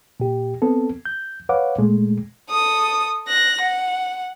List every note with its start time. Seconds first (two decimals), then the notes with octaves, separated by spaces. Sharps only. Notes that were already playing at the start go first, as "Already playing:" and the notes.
0.20 A#2 G4
0.62 B3 C4 A4
1.05 G6
1.49 B4 C#5 F5 F#5 D6
1.78 A#2 G#3 A3
2.50 A4 D#6
3.28 F#6 A#6
3.61 F#5